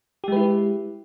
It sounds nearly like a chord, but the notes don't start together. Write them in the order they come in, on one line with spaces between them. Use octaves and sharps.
G4 G#3 B4 E4